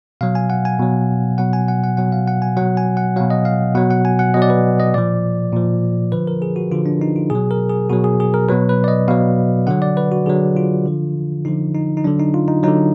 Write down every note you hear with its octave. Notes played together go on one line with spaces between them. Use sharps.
B2 F#3 F5
G#5
F#5
G#5
B2 F#3
B2 F#3 F#5
G#5
F#5
F#5
B2 F#3 F#5
F5
F#5
G#5
B2 F#3 F#5
G#5
F#5
B2 F#3 F5
D#5
F5
B2 F#3 F#5
F#5
G#5
F#5
B2 F#3 D#5
D5
B4
D#5
A#2 F3 D5
A#2 F3
D3 F3 B4
A#4
G#4
F#4
D3 F3 F4
D4
D#4
F4
B2 F#3 G#4
A#4
G#4
B2 F#3 F#4
G#4
G#4
A#4
B2 F#3 B4
B4
D5
D#5
B2 F#3 F5
D3 F#3 F#5
D5
B4
F#4
D3 F#3 G#4
F4
D3 F3
D3 F3 D#4
D#4
D#4
D3 F#3 D4
D#4
F4
D#4
D3 F#3 D#4